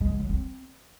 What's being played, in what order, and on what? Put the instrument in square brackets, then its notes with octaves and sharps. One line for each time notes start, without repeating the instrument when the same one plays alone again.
[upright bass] G#3
D3
F#3
C4